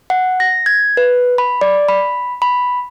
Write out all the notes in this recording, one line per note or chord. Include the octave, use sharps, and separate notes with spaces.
F#5
A#6
G#6
B4
B5
D5
B5
B5